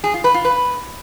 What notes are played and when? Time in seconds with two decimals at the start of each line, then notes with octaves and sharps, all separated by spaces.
0.04 G#4
0.14 F4
0.24 B4
0.34 F4
0.45 B4